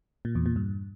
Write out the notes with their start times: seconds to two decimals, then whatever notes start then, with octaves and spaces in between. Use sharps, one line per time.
0.25 A#2
0.35 E2
0.46 A#2
0.56 G2